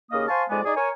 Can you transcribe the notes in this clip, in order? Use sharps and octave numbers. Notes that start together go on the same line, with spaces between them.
D#2 C#3 A#3 D#5 F5 D#6
C5 F5 G#5 A5 C6 C#6
F2 G#2 G#3 B3 D5 G#5
D#4 G#4 D5
A#4 C#5 G#5